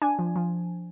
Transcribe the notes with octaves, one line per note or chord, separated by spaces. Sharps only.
D4 G#5
F3
F3